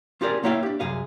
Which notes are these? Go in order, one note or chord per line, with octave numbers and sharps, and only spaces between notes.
C#4 F4 G4 G#4 A#4 D5
A#3 E4 C#5 E5 F5 G5
D4 G4
C2 F#2 G#4 F5